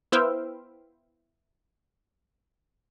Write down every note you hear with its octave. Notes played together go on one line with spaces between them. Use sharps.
B3 E4 C5 E5 F5 G5